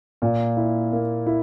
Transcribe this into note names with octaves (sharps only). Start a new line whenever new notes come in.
A#2
E4
A#3
E4